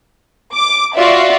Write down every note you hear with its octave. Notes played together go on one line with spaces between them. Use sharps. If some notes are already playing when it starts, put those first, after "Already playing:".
D6
F4 F#4 D5 E5